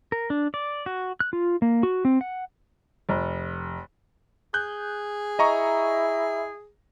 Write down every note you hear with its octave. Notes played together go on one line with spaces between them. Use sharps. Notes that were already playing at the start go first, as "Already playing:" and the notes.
A#4
D4
D5
F#4
F#6
F4
A#3
F#4
C4
F#5
F1
G#4 F#6 G6
E4 D#5 A#5 C#6